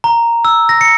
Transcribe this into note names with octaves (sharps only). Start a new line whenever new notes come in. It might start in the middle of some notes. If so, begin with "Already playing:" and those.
A#5
E6
A#6
C#7